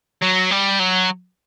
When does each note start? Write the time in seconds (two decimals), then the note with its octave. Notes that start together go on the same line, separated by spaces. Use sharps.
0.22 F#3
0.51 G3
0.79 F#3